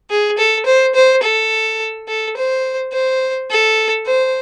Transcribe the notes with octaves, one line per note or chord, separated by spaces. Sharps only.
G#4
A4
C5
C5
A4
A4
C5
C5
A4
C5